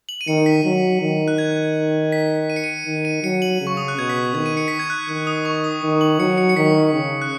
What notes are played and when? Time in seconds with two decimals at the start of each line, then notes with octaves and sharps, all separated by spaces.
0.09 F#7
0.21 D#7
0.27 D#3 C#7
0.46 B6
0.64 F#3
1.02 D#3
1.28 F#6
1.38 G#6
2.12 B6
2.50 D#7
2.56 C#7
2.64 D#7
2.86 D#3
3.05 D#7
3.23 F#3 C#7
3.42 F#7
3.61 C#3
3.67 C#6
3.77 D#6
3.88 F#6
3.98 B2 G#6
4.09 B6
4.34 D#3 G#6
4.46 D#7
4.57 C#7
4.68 B6
4.79 G#6
4.90 F#6
5.09 D#3 F#6
5.27 D#6
5.45 C#6
5.64 D#6
5.82 D#3 D#6
6.01 F#7
6.19 F#3 C#7
6.38 C#7
6.49 C#7
6.56 D#3 B6
6.93 C#3
7.22 F#6